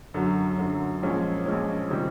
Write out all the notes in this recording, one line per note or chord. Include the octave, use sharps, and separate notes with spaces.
F#2 D3 F#3
F#2 D3 F#3
A#1 A#2 F3 G#3 C#4
A#1 A#2 F3 G#3 C#4
C3 D#3 G3